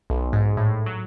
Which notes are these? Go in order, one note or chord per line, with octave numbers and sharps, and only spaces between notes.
B1
G#2
A2
F#3